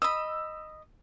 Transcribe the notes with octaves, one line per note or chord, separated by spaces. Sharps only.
D#5 B5 E6